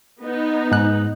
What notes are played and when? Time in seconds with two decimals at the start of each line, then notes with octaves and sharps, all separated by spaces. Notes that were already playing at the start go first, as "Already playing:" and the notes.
0.22 B3 D#4
0.72 G#2 F#6